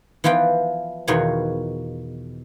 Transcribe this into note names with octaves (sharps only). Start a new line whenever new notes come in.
E3 F3 B3 F4 G5
E2 B2 D#3 F4 C#5